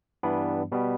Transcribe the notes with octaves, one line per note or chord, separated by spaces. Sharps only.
G2 E3 G3 B3 D4
B2 G3 B3